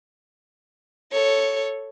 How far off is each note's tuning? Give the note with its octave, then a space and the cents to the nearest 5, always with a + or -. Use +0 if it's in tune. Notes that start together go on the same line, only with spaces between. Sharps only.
A4 +0 C#5 +0